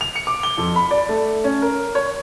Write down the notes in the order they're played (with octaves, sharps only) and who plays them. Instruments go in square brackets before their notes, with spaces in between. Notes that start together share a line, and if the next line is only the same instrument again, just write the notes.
[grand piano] F7
C#7
D6
G7
F2
B5
D5
A3
C#4
A#4
C#5